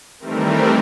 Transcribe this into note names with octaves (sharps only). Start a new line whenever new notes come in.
D#3 E3 G3 A3 C4 A#4